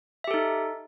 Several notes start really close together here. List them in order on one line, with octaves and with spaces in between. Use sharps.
E5 G4 A4 D#4